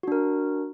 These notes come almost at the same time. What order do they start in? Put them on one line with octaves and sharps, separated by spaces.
F#4 D4 A#4